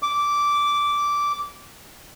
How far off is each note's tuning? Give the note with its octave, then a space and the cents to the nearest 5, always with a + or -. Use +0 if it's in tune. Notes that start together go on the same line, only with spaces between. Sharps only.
D6 -10